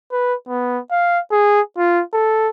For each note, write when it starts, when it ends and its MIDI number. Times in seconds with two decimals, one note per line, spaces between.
0.12 0.34 71
0.49 0.79 59
0.91 1.19 77
1.32 1.61 68
1.78 2.03 65
2.14 2.50 69